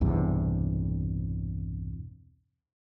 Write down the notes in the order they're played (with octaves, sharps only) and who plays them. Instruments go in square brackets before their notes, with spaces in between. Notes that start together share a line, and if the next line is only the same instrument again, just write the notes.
[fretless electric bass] B1 E2 G2 C3